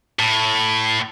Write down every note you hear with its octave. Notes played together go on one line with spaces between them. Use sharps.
A2